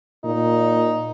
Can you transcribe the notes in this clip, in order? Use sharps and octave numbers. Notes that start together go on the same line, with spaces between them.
A#2 D#4